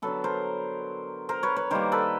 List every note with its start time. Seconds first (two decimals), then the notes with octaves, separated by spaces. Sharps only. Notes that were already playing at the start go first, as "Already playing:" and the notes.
0.02 D3 F#3 B3 A4 B4
0.24 A#4 C5
1.29 A#4 C5
1.43 B4 C#5
1.56 B4 C#5
1.71 D#3 G3 A#3 A#4 C5
1.92 A4 B4